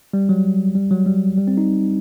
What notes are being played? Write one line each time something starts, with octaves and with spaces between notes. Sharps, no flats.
G3
F#3
G3
F#3
G3
G3
C4
D#4